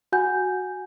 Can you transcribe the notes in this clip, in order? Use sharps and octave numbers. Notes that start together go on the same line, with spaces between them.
F#4 F#5 G#5 G6